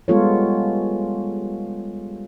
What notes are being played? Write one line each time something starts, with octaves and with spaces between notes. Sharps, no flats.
G3 G#3 B3 F4 A4 C#5